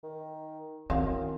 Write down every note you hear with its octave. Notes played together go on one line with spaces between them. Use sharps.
D#3
F#2 D#3 C4 E4 F5